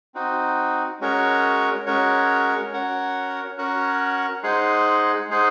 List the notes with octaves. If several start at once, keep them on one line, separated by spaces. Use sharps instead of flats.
C4 D#4 F#4
G#3 C#4 F#4 A#4 C#5
G#3 C#4 F#4 A#4 C#5
C#4 F#4 A#4 C#5 F#5
C#4 F#4 A#4 C#5 F#5
G#3 D#4 G#4 C5 F#5
G#3 D#4 G#4 C5 F#5